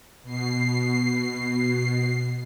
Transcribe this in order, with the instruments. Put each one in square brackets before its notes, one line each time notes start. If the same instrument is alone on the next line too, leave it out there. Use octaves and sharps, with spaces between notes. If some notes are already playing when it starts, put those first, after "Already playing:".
[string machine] B2 C7